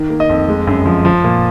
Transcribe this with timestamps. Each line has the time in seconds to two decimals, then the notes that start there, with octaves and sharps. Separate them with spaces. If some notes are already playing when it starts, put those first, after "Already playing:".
Already playing: D#3
0.10 A#3
0.20 D#5
0.29 F2
0.48 G#3
0.67 F#2
0.86 F3
1.05 F3
1.24 A#2